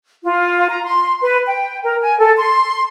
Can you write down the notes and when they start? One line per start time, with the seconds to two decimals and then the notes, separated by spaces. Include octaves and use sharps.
0.23 F4
0.68 A#5
0.83 C6
1.21 B4
1.47 G5
1.83 A#4
2.01 G#5
2.19 A4
2.37 C6